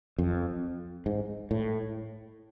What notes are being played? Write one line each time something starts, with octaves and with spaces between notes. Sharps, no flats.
F2
G#2
A2